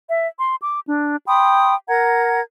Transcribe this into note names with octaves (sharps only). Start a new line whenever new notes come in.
E5
C6
D6
D4
G5 B5 C6 D#6
A#4 F#5 A#5 G#6